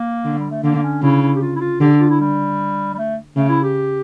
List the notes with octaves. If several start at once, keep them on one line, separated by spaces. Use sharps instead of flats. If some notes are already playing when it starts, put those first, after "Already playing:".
Already playing: A#3
D3
G3
A3
D3 A#3
A#3
C#4
C#3 E4
E4
G4
F4
E4
F4
D3 G4
F4
E4
G3
G3
A3
C#3 A3
E4
G4